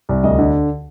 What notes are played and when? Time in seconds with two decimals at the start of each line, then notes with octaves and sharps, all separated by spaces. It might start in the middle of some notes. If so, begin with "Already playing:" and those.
0.09 C2
0.24 D2 D#5
0.39 D3